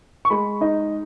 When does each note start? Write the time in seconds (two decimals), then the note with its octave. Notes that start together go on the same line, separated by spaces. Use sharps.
0.25 C#6
0.30 G#3 B5
0.61 D#4 D#5